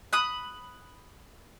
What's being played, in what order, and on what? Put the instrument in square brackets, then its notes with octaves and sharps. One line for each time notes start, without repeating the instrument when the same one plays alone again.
[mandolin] B5 D#6 F#6